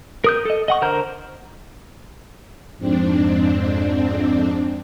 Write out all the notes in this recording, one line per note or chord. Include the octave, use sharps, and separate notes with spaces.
A#4 D#6 G6
A4 D#5
D#5 F#5 C#6
D3 A#4 C5 A#5 G6
F2 G#2 C4 D4